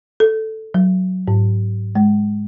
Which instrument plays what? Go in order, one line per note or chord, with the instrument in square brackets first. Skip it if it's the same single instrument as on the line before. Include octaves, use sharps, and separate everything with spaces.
[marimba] A4
F#3
G#2
G#3